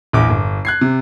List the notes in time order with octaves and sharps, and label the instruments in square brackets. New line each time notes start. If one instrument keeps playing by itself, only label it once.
[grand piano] A#1 E2 D6
G1
F#6 G#6 C7
C3